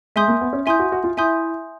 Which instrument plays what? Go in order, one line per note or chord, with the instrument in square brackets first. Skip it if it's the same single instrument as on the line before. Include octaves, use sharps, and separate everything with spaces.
[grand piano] G#3 [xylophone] E5 G#5 C6 D#6 G6
[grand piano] A#3
B3
C#4
[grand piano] E4 [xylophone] E5 G#5 C6 D#6 G6
[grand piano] F#4
F#4
F4
[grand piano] E4 [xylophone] E5 G#5 C6 D#6 G6